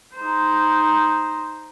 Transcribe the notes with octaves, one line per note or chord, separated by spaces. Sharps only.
D#4 C5